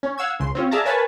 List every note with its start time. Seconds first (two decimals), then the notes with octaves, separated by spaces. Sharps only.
0.03 C#4
0.18 F5 F#5 E6 G#6
0.39 C#2 C#3 C6
0.55 C4 C#4 F4
0.71 G#4 D5 E5 F5 A5 A#5
0.85 A#4 B4 C#5 G#5 A5 B5